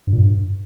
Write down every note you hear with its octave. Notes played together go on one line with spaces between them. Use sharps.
G2
A#2
G2